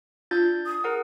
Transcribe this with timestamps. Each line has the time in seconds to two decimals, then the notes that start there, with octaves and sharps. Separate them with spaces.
0.31 D4 F4 G6 A6
0.66 D#6
0.84 G#4 A#4 F#5